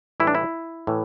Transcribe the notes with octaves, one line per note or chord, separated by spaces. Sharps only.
A2 E3 G3 E4
D4
E4
A2 E3